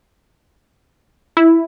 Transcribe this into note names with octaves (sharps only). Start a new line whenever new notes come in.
E4